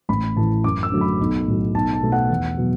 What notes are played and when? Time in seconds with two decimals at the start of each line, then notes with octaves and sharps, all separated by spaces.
0.09 A1 B5
0.36 A2 E3 A5
0.64 F#2 D6
0.83 E6
0.92 D3 F#3 A3
1.01 B5
1.20 B1
1.47 A2 F#3
1.74 B1 A5
1.93 A5
2.03 B2 A3
2.12 F#5
2.30 E2
2.57 B2 F#3